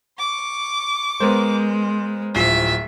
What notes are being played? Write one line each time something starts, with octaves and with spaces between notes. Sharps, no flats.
C#6 D6
G#3 B3 A#4 C5
D1 F3 E5 C7